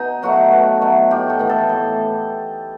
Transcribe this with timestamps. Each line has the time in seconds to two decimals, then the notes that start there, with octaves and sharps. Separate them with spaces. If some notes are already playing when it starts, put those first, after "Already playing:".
Already playing: B2 D#4
0.23 F#3 A3 F#4
0.52 B2
0.81 F#3 A3
1.11 A2 G4
1.30 A4
1.39 E3 B3
1.49 A4
1.69 A2